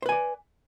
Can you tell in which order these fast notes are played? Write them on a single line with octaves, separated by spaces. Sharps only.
C5 B4 G#5 D5